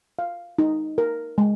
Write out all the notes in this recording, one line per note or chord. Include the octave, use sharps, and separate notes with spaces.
F5
D#4
A#4
G#3